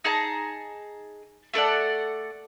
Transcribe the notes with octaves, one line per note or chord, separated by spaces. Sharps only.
D#4 G#4 A5 A#5
A3 A4 D5 F#5